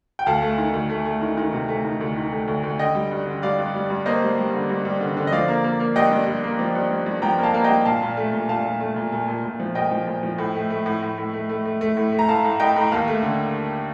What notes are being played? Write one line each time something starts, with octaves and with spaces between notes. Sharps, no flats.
G5
D2 F5 A5
A3
D#3
D2
A3
A3
D#3
D#3
C3
A3
D#3
D2
D#3
A3
D2
D2
D3 D#5 G5
G3
G2
D3
G3 D5 F5
G2
G3
G2
A#3 C5 D#5
G3
G3
D3
G2
G2
D3
D3
D#5
F3 D5 F5
A#3
A#3
A#3
G2 D#5 G5
G2
G2
A#3
F3
G2
G2
G2
F3 G5 A#5
A#3
F5 A5
A#3
D#5 G5
G2
A#2 F5 A5
A#2
A3
A#2
A#2 F5 A5
A#2
A3
A#2
A#2
A#2
A#2
F3
A#2 D#5 G5
F3
A#2
F3
A2
A3
A3
A2
A2
A2
A3
A3
A3
A3
A2
A3
A#5
A2 F5 A5
A2
A2 D#5 G5
A2 A#5
D#2 F5 A5
A3
D3